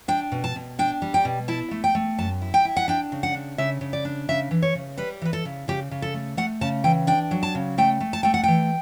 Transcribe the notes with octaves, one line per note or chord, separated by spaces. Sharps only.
D4 G5
B2
A5
B2
D4 G5
G3
G5
B2
E4 A5
A3
G5
A3
F#2 A5
E4
G5
E4
F#5
D4 G5
C#3
F#5
D4
C#3 E5
C#3
D5
D4
C#3 E5
E3
C#5
C#3
G3 B4
E3 B4
A4
C#3
C#3 G4
C#3
A4
A3
A3 F#5
C#3 A5
E3 G5
D4 G5
F#3
A5
C#3
A3 G5
A3
A5
A3 G5
F#5
E3 G5